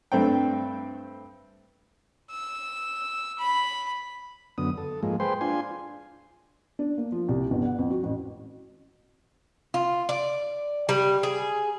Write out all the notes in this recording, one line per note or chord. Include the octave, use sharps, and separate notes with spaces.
G2 A3 C4 D4 G5
E6
B5
F#2 D3 B3 D#6
A4
G#2 F3 G#3 A#3
G#4 B4 C5 G5 C6
D4 F4 G#5 C6
D4
A#3
F3
C2
G1
F#5
F2
F#4
A1
F4
D5
G3
G#4